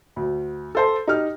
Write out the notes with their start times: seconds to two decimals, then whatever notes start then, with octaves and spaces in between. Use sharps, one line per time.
0.16 D2
0.75 A4 C5 A5
1.07 D#4 G4 F6